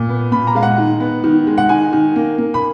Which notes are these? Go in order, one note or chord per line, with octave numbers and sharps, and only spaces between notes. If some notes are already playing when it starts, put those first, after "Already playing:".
Already playing: A#2
B3
A#2 B5
A#5
G#3 F5
F#5
D#3
B3
D#3
G#3
F#5
D#3 G#5
D#3
A#3
A#3
B5